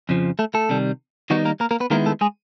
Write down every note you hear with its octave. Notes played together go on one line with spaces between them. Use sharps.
F2 C#3 F3
A3 A4
A3 A4
C3 D#3 G3
D#3 G3 B3 D#4 F#4
A#3 A#4
A#3 A#4
A#3 A#4
B3 B4
D#3 G#3 A#3 B3 E4 A#4
A3 A4
G#3 G#4